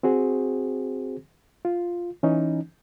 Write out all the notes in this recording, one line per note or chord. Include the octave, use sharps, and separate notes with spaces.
C4 F#4 G#4 C5
F4
E3 C#4 D#4